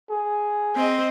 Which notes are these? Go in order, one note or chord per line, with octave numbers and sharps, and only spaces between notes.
G#4
C4 C5 D#5